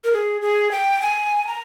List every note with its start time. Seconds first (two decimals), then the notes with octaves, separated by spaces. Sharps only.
0.04 A#4
0.13 G#4
0.42 G#4
0.71 G5
1.02 G#5
1.47 A#5